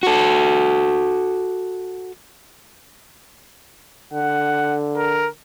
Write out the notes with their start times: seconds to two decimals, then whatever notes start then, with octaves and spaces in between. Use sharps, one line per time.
0.03 F#4 A4
4.13 D3 F#5
4.97 A#4